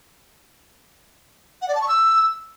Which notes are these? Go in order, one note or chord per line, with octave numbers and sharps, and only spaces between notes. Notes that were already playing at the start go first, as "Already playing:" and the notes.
F#5
D5
A5
C#6
E6